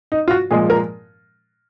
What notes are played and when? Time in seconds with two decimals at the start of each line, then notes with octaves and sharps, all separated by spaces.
0.12 D#4
0.28 F4
0.31 F#4
0.51 A#2 F3 G#3 G#4
0.70 A#4